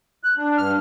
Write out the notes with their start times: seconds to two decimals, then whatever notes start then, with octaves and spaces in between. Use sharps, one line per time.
0.23 F#6
0.37 D4
0.58 G2 F6